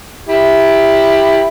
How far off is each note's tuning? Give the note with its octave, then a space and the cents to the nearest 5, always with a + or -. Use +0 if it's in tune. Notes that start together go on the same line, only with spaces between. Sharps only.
E4 +0 G4 +15